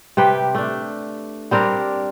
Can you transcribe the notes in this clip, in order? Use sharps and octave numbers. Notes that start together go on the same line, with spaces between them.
C3 G4 B4 G5
A3 D4
G3 C4 D4 A#4